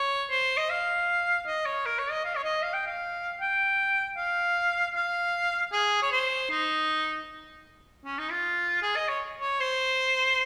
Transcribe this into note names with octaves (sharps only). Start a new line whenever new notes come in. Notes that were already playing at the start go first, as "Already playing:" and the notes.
Already playing: C#5
C5
D#5
F5
D#5
C#5
A#4
C#5
D#5
F5
C#5
D#5
F5
G5
F5
G5
F5
F5
G#4
C#5
C5
D#4
C#4
D#4
F4
G#4
D#5
C#5
C#5
C5